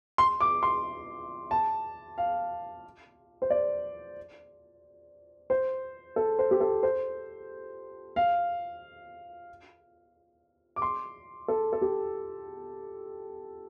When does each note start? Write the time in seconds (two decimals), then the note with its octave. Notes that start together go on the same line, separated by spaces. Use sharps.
0.18 C6
0.41 D6
0.63 C6
1.51 A5
2.18 F5
3.42 C5
3.50 D5
5.50 C5
6.16 A4
6.39 C5
6.51 G4
6.60 A4
6.83 C5
8.16 F5
10.76 D6
10.82 C6
11.48 A4
11.73 A4
11.82 G4